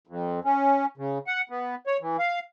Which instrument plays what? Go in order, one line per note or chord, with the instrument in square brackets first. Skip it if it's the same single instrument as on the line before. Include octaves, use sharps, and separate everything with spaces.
[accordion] F2
C#4
C#3
F#5
B3
C#5
E3
F5